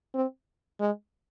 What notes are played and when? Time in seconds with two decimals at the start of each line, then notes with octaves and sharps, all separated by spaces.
0.15 C4
0.80 G#3